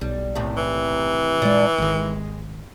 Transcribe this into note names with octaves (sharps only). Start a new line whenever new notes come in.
B1 G3
D#2 A2 C3
E3
G2 A#2 G#3 D4
G#1 D#2 D#3 G#3